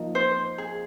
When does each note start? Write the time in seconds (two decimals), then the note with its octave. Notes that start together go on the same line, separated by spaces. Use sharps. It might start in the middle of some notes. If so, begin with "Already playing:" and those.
Already playing: F3 A#3 D#4 D#5
0.15 C5
0.58 G#4